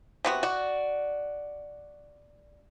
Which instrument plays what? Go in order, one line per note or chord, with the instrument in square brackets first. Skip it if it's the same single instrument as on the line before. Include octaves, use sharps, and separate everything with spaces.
[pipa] C3 B3 F#4
[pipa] F#4 [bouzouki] D5